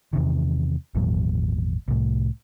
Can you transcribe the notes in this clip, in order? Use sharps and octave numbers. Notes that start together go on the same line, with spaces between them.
E2 C3 D#3
G#1 E2 A#2 F#3
C2 A2